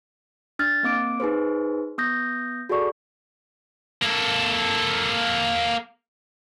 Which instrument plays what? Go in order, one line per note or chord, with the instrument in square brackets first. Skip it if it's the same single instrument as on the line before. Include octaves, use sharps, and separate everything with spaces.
[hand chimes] D4 F6 A6
A#3 C4 D6 D7
D#4 G#4 B4 C5
B3 D#6 G6 A#6
F#4 G#4 A4 D5 C#6
[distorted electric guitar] A#3 A4